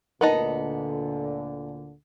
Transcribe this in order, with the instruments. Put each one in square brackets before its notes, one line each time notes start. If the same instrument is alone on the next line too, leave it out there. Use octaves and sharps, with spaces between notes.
[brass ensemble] D2 A#2 D3 [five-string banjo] B3 D#4 D#5 [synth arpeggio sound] A#4 A5